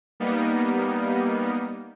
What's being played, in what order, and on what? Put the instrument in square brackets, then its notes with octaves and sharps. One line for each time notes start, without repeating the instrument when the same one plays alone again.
[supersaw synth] G3 A#3 B3 D#4